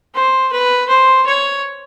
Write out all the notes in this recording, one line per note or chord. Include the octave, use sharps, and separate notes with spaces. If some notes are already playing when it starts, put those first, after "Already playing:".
C5
B4
C5
C#5